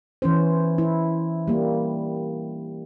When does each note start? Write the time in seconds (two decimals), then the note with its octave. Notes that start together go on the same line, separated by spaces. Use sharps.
0.22 E3 C#4 C5
0.78 E4
1.48 G3 A#3